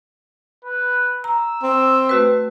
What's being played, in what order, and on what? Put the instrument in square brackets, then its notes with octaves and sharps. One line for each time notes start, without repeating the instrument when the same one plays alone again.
[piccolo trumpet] B4
[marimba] A#5 [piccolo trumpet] E6
[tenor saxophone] C4
[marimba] A3 F#4 B4